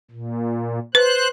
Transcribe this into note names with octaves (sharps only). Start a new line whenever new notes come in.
A#2
B4 C5 F#6